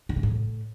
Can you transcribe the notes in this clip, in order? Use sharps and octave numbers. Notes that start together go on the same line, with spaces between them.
D#3
C#3
A2